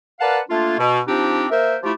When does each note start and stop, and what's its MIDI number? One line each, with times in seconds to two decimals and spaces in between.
0.20 0.39 70
0.20 0.39 71
0.20 0.39 74
0.20 0.39 77
0.20 0.39 78
0.20 0.39 81
0.50 0.75 57
0.50 0.75 58
0.50 0.75 62
0.50 0.75 65
0.78 1.01 47
1.08 1.46 53
1.08 1.46 60
1.08 1.46 62
1.08 1.46 63
1.08 1.46 67
1.50 1.76 58
1.50 1.76 70
1.50 1.76 72
1.50 1.76 76
1.83 1.92 53
1.83 1.92 57
1.83 1.92 64
1.83 1.92 65
1.83 1.92 67